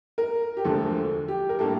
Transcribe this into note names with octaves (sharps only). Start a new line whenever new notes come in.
A#4
G4
E1 D2 D3 F3 A3 A4
G4
A#4
A2 G3 A#3 D4 A4